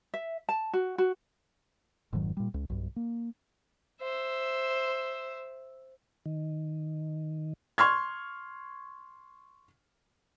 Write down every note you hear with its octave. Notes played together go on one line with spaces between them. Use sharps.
E5
A5
F#4
F#4
F1 G#2 D#3 F#3
A#2 G3
C#2
B1 G2
A#3
C5 E5
D#3
C6 C#6 F6 G#6